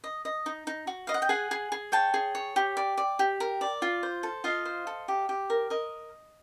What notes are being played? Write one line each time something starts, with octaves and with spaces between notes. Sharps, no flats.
D#5
D#5
D#4
D#4
F#4
D#5 F5
F#5
G5
G#4 F#5 G#5
G#4
G#4
C#5 G5 A5
G#4
C#5
G4
D5
D5
G4
A#4
D5
F4
C5
A4
F4 D#5 F5
C5
A4
G4
G4
A#4
A#4 D#5